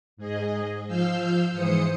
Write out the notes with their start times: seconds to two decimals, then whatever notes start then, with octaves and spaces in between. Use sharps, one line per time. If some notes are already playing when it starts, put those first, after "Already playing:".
0.17 G#2 G#4 D#5
0.87 F3 F5 E6 F6 G6
1.52 G#2 E3 C5 D#6 C#7